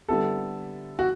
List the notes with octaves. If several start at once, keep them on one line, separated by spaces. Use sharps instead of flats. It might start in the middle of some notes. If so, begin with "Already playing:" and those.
D3 G3 B3 E4 G4 A4
F#4